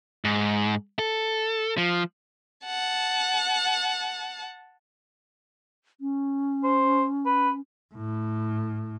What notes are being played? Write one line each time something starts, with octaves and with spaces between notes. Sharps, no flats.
G#2
A4
F3
F#5 A5
C#4
C5
B4
A2